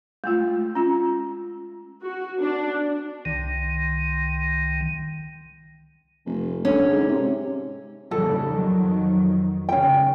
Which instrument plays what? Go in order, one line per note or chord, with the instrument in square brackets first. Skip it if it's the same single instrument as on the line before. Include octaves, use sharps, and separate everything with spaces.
[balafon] G#3 A3 F4
C#4 F4
[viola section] F#4
D4
[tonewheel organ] C2 D#3
[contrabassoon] F1
[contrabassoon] D3 [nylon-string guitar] C#4
[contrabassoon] G#2
C3
[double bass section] D#2 C#3 G3 [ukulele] A4
[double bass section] F2 D#3 F#3
[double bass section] D#2 C#3 [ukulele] C#4 G5